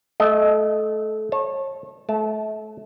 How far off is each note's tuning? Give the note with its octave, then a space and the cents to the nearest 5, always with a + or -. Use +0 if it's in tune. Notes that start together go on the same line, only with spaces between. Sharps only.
A3 -20 D#5 +0
C#5 -35 A5 +0
A3 -30 A5 +0